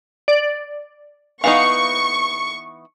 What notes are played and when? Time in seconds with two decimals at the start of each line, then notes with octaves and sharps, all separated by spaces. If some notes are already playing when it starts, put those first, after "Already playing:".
0.28 D5
1.44 E3 B3 D#4 F5 C#6